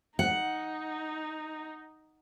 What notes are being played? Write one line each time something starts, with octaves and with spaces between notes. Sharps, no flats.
D#4 F#5